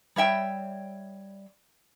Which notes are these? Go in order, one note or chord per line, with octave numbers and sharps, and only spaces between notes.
G3 C#5 E5 G5